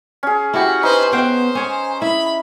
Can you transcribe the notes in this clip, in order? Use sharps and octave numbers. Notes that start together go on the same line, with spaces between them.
C#4 G#4
E4 F#4 G4 G#5
D#4 B4 C5
B3 F#4 C5 F5 G5
C#4 C#5 G#5
E4 E5 B5